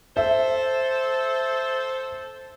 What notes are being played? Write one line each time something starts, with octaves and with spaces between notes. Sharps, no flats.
A4 C5 E5